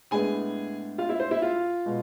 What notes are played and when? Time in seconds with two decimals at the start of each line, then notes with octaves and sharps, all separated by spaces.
0.11 A2 G#3 B3 D4 G#4 G#5
0.98 F4 F5
1.09 E4 E5
1.20 C5
1.31 E4 E5
1.42 F4 F5
1.86 B2 G#3